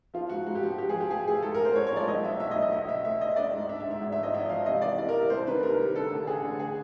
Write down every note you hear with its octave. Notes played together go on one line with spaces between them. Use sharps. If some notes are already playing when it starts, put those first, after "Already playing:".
F3 F4
G#2 F#4
G#2 F#4
G4
F3 F#4
F3 G4
G#4
F3
G4
A2 G#4
A3 G#4
G#2 A4
A#4
A1 C5
G#3 C#5
C#5
F3 D5
B1 D#5
B1 E5
B1 E5
D#5
B1
D#5
D2 D#5
D2 E5
D2 E5
D2 D#5
D4 D5
G#2
D4 E5
E5
G#2
E5
G#1
E5
F3 D#5
G#1 E5
F3 F5
C3 D#5
E3 D5
C3 D5
A#4
C3
C2 C5
D#3 B4
C2 A#4
G3
D3 A4
A1
A1 G#4
D3
G#4